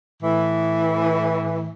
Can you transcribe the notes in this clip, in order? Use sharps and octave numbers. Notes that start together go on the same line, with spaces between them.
A2 E3